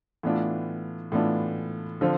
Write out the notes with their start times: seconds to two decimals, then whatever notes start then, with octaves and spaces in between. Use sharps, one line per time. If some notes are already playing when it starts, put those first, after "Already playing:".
0.23 A2 E3 B3 D4 F4
1.12 A2 E3 B3 D4 F4
2.01 D3 F3 C4 F4